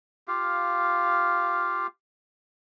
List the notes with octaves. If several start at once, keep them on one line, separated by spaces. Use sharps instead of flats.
F4 G4 F5